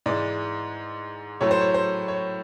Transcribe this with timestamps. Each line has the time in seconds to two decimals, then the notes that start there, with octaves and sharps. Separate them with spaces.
0.06 G#2 E3 G#3 D5
1.41 A2 F#3 A3 C#5
1.51 C5
1.61 C#5
1.74 C5
2.08 C#5